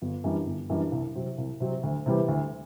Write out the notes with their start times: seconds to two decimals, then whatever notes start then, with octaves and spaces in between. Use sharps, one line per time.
0.02 G1
0.24 F#2 E3 G3 D4
0.46 G1
0.70 F#2 E3 G3 D4
0.91 C2
1.15 C3 F#3 C4
1.38 C2
1.60 C3 F#3 C4
1.83 D2
2.06 C3 E3 G3 B3
2.28 D2